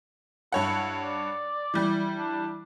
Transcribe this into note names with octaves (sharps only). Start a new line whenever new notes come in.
G2 E4 C#5 F#5
D5
E3 G3
D4